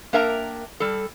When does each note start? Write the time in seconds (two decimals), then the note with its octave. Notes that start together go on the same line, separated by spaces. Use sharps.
0.13 A#3 D4 A#4 E5 G5 A#5
0.80 G3 A4